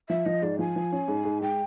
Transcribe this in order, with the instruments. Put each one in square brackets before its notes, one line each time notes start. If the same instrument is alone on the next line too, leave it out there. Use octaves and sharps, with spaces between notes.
[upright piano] F3 [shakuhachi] E5
[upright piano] F3 [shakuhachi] D#5
[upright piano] G#2 [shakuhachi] D5
[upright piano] F3 [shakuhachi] G#5
[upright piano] F3
C#4
G#2
G#2
[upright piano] G#3 [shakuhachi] G5